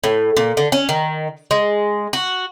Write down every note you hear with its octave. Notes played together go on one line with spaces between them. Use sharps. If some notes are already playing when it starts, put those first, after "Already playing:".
A2
A#2
D3
C#4
D#3
G#3
F#4